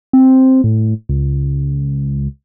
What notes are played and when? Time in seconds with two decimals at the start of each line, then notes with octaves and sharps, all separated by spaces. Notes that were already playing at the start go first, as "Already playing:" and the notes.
0.13 C4
0.64 A2
1.09 C#2